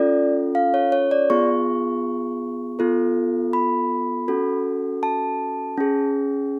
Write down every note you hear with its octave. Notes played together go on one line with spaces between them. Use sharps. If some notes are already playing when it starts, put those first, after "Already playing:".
Already playing: C#4 F4 A4 D5
F5
C#5
C#5
D5
B3 F4 G#4 C#6
B3 F4 A4
B5
C#4 F#4 A4
A5
C#4 G#4